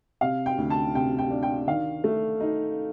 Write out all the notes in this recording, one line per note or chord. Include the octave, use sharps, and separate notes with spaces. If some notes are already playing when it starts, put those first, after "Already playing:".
C3 F5
G5
D2
A5
C3 G5
G5
D4
G5
D#3 F5
A3
D#4